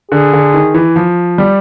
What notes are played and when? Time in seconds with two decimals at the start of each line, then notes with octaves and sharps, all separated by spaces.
0.12 D3 G#4
0.33 D3
0.54 D#3
0.74 E3
0.96 F3
1.38 G3